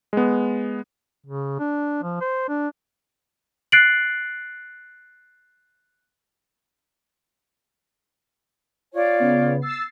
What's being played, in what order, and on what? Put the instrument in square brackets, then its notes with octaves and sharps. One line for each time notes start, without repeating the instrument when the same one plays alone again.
[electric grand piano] G#3 B3
[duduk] C#3
D4
F3
C5
D4
[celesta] F#6 A6 C7 D7 F#7
[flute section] F4 C#5 D5
[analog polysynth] C#3 B3
E6 A6 C7